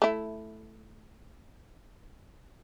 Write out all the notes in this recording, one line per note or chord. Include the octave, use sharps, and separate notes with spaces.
A3 E4